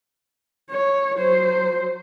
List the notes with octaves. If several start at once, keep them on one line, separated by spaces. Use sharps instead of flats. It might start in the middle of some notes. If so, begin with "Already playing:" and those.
C#5
F#3 C5